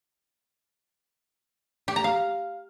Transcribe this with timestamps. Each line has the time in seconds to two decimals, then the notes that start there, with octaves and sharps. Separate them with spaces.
1.88 G4
1.96 A#5
2.04 F5